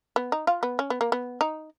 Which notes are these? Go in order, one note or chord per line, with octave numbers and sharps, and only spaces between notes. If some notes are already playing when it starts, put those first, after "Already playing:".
B3
D#4
F4
B3
C#4
B3
A#3
B3
D#4